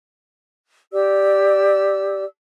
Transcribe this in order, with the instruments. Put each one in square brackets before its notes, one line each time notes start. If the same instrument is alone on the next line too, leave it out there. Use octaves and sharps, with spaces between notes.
[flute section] G4 D5 E6